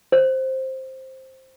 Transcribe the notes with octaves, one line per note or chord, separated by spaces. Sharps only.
C5